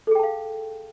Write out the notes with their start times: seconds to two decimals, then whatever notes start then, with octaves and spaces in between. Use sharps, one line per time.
0.07 A4
0.11 G#4
0.15 G5
0.19 A5
0.23 F5